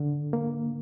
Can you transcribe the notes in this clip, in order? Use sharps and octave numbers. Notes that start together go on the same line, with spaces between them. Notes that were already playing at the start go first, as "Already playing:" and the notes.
Already playing: D3
A#3